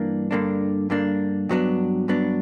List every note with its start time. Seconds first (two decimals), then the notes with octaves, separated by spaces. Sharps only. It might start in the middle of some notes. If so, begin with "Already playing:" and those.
Already playing: G2 E3 A#3 D4
0.31 G2 D3 A#3 D4
0.90 G2 D3 A#3 D4
1.49 G2 F#3 B3 D4
2.08 G2 F#3 B3 D4